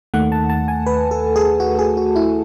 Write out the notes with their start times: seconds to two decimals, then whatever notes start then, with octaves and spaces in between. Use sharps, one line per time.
0.14 D#2 D#3 A3 F#5
0.32 A5
0.50 A5
0.68 G#5
0.86 B4
1.11 A4
1.36 G#4
1.60 F#4
1.79 G#4
1.97 F#4
2.16 E4